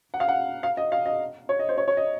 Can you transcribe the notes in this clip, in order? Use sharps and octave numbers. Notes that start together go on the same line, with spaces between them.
F#5
F5
F#5
F5
D#5
F5
D#5
C#5
D#5
C5
C#5
C#5
D#5